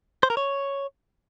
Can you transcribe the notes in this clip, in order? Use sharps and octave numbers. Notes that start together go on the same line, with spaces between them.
C5
A#4
C#5